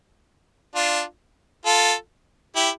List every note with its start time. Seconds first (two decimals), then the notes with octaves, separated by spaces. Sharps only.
0.75 D4 F4
1.66 F4 A4
2.56 E4 G4